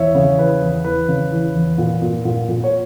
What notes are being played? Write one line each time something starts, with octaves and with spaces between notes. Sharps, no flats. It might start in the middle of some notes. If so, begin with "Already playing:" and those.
Already playing: E2 C#5 E5
C#3
E3 B4
E2
E2 B4
C#3
E3
E2
A#2
A#2
A#2
A#2
C#5